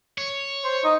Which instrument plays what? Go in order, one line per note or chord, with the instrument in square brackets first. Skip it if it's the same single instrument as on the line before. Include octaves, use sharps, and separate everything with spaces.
[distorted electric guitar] C#5
[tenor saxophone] C5
D#4